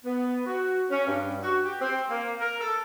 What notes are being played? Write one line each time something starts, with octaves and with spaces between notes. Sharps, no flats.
B3
F#4
C#4
G2
F#4
G4
C4
A#3
A#4
A4